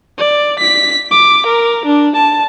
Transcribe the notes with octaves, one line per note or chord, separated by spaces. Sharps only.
D5
B6
D6
A#4
D4
A5